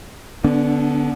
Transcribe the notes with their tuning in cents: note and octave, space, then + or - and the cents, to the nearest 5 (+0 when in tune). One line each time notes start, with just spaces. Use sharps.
D3 +0 B3 +0 D4 -45